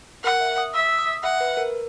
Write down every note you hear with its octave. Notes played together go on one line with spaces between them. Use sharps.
A#4 F#5
E5
D#6
E5 E6
E6
D#6
E5 F#5
B4
A#4